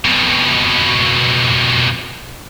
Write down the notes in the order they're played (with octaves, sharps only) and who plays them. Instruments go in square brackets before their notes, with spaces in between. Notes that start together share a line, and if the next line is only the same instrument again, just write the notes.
[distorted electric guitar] F2 B2